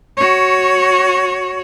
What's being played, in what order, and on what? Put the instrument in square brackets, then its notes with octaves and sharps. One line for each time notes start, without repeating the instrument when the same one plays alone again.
[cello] F#4 C#5